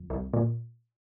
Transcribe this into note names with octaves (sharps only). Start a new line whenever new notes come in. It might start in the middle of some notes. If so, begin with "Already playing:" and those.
Already playing: F2
C2
A#2